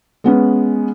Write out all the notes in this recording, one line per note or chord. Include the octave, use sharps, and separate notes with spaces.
G#3 B3 C#4